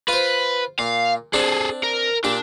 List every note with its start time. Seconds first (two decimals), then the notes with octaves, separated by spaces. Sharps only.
0.08 F4 B4 C5
0.79 A#2 F5
1.33 C4 D4 G#4 A4
1.83 A#4
2.24 A#2 D4 G4